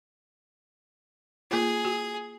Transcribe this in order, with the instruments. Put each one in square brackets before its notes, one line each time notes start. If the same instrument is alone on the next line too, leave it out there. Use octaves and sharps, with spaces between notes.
[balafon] A#3 F4 [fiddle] G#4
[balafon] F#4